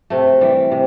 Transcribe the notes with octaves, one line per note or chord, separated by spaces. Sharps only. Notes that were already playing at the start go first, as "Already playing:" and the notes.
C3 A3
E3 G3
C3